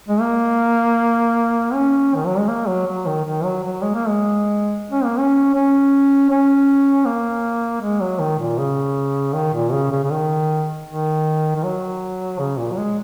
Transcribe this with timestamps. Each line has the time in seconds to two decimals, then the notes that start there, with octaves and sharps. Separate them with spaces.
0.08 G#3
0.21 A#3
1.73 C#4
2.15 D#3
2.26 F#3
2.38 G#3
2.48 A#3
2.67 F#3
2.86 F#3
3.06 D#3
3.25 D#3
3.44 F#3
3.64 F#3
3.82 G#3
3.95 A#3
4.08 G#3
4.91 C#4
5.04 A#3
5.17 C#4
5.54 C#4
6.30 C#4
7.06 A#3
7.82 G#3
8.01 F#3
8.20 D#3
8.39 A#2
8.59 C#3
9.34 D#3
9.54 A#2
9.72 C#3
9.92 C#3
10.04 C#3
10.10 D#3
10.86 D#3
11.56 D#3
11.63 F#3
12.39 C#3
12.58 A#2
12.72 F#3
12.78 G#3